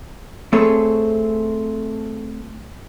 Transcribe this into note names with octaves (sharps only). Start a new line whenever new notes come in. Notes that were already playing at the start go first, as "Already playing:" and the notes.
A3 C4 G#4 A4 C#5